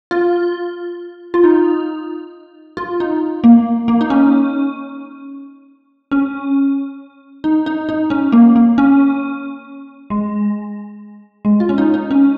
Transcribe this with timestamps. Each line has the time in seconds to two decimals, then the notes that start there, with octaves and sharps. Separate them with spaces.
0.11 F4
1.34 F4
1.44 D#4
2.77 F4
3.00 D#4
3.44 A#3
3.88 A#3
4.01 D#4
4.10 C#4
6.11 C#4
7.44 D#4
7.66 D#4
7.89 D#4
8.10 C#4
8.32 A#3
8.56 A#3
8.78 C#4
10.10 G#3
11.45 G#3
11.60 F4
11.69 C#4
11.78 D#4
11.94 D#4
12.11 C#4